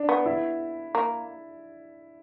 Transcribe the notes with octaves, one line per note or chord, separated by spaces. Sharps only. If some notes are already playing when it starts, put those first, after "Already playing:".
Already playing: D4
B3
E4
A#3